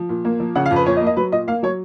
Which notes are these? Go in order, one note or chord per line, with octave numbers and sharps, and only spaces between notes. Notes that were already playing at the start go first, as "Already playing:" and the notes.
Already playing: F3
A#2
A#3
F3
C#3 F#5
F5
F2
B4
A#2 C#5
D#5
A#3
D#5
F#3 B4
A#2 D#5
A#3 F5
F#3 C#5